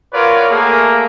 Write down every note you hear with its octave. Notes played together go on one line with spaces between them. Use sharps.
F4 F#4 A#4 B4 C#5 D5
A3 A#3 G#4